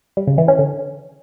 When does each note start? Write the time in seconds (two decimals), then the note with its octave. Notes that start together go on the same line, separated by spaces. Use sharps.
0.17 G3
0.27 C#3
0.38 E3
0.48 C#4
0.59 D3